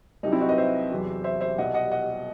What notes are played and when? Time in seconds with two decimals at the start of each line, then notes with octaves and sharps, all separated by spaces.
0.23 C2 C3 F#3 D#4
0.32 C4 E4
0.41 D#4 F#4
0.49 B4 D#5
0.58 C5 E5
0.91 E2 C3 F#3
1.24 C5 E5
1.41 C5 E5
1.58 C2 B2 G3 D#5 F#5
1.74 D#5 F#5
1.91 D#5 F#5